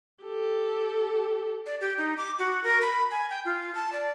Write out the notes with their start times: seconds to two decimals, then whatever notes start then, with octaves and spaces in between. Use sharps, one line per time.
0.24 G4 A4
1.66 D5
1.81 G4
1.98 D#4
2.18 D6
2.39 F#4
2.64 A#4
2.82 B5
3.11 G#5
3.30 G5
3.45 F4
3.75 A5
3.93 D5